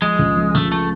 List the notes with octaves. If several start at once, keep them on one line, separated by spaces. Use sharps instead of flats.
F3 G#3
C#2
F3
C#2 A3
A3